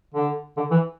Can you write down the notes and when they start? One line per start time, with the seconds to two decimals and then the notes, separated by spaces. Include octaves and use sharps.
0.14 D3
0.57 D3
0.71 E3